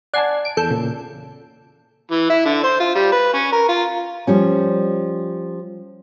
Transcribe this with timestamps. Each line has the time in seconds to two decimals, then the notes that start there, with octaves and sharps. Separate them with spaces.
0.14 D5 F#5 G#5 A5 G#6 C7
0.45 D7
0.57 E2 A4 G6
0.70 A#2 C#3
2.11 E3
2.30 E4
2.45 D3
2.64 C5
2.80 F4
2.96 G3
3.12 B4
3.34 C#4
3.52 A#4
3.69 F4
4.27 F3 G3 C#4